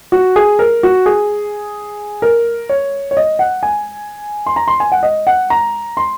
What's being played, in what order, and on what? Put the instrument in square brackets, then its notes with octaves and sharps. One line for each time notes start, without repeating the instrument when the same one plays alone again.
[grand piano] F#4
G#4
A#4
F#4
G#4
A#4
C#5
C#5
D#5
F#5
G#5
C6
A#5
C6
G#5
F#5
D#5
F#5
A#5
C6